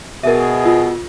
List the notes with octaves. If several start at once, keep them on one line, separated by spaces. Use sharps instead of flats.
B2 G#4 A#4 E5
F4